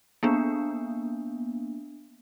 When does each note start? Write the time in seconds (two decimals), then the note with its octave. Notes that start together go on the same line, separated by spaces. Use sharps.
0.23 A#3 B3 D4